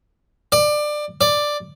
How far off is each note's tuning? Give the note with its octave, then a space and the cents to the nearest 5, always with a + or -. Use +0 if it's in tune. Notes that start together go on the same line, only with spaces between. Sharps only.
D5 +20
D5 +5